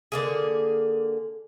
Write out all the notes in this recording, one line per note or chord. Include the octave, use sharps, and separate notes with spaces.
D3 A#3 G#4